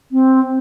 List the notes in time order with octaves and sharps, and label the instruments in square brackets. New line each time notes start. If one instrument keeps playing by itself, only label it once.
[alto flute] C4